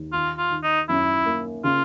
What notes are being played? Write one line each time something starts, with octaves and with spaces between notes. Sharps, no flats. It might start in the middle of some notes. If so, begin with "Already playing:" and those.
Already playing: D#2
D#3 F4
F4
D#3
D#4
F#2 E4
A#3
C#3 F4